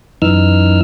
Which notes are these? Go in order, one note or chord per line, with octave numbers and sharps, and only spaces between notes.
F#2 E3 D#4 E6 F6